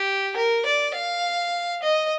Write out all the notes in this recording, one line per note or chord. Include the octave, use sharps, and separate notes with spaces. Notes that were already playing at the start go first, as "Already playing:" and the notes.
Already playing: G4
A#4
D5
F5
D#5